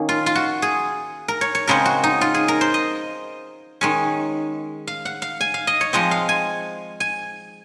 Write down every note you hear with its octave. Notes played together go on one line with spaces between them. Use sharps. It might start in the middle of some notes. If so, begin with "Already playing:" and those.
Already playing: D#3 A#3 C#4
F4
F4
F#4
G#4
A#4
C#5
C#5
C#3 G#3 C4 A#4
F#4
D#4
F4
G#4
A#4
C5
D#5
D#3 G#3 C#4
F5
F#5
F5
G#5
F5
D#5
C#5
F3 G#3 C4 D#5
F5
G#5
G#5